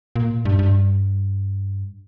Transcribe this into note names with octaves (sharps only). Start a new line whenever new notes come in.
A#2
G2
G2